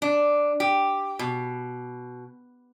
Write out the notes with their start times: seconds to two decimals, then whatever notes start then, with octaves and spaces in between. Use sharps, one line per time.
0.02 D4
0.60 G4
1.19 B2